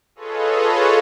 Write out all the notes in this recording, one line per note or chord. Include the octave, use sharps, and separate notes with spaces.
F4 G#4 A4 B4 C#5 D#5